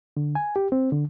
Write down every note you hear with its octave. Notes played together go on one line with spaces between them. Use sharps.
D3
G#5
G4
C4
D3